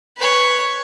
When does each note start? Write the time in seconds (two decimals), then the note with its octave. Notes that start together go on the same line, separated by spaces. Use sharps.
0.17 B4 C#5